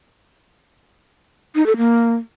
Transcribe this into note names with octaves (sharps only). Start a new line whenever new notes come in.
D#4
A4
A#3